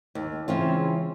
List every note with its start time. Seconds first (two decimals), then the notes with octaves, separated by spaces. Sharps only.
0.15 D#2
0.48 C#3 E3 G#3 C4 C#4 E4 F4